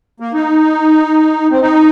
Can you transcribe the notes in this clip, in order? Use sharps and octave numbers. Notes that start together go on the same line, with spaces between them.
A#3
D#4
C4
D#4